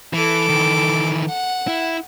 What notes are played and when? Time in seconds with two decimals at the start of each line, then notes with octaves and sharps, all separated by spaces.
0.13 E3 A4 D6
0.49 D#3 E3
1.28 F#5
1.68 E4